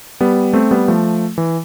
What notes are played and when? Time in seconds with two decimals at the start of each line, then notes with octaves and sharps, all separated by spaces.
0.21 G3 B3
0.53 A3 C4
0.71 G3 B3
0.88 F3 A3
1.38 E3